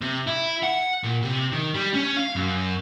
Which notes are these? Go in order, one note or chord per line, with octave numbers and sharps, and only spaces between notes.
C3
E4
F#5
A#2
C3
D#3
G3
C#4
F5
F#2